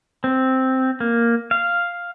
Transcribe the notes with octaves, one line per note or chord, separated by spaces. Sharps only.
C4
A#3
F5